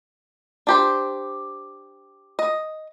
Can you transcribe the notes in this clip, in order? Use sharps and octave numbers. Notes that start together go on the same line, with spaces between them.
D4 G4 C5
D#5